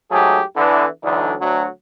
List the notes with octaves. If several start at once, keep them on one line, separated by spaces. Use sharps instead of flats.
G#2 F#3 A3 G4 G#4
D3 E3 B3
D2 D3 E3 F#3 D4 D#4
D2 F#3